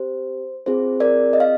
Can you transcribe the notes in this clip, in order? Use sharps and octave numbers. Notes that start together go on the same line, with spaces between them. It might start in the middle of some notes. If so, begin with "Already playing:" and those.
Already playing: C4 G4 C5
C4 F4 G#4 C5
A#4 D5
D#5
F5